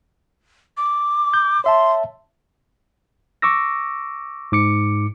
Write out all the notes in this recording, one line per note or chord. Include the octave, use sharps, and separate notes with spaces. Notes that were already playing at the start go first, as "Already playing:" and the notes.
D6
G6
C#5 E5 A5 C6
C#6 D6 E6 A#6
G#2 D6 C#7